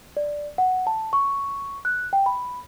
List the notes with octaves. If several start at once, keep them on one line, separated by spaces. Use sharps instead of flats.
D5
F#5
A5
C#6
F#6
G5
B5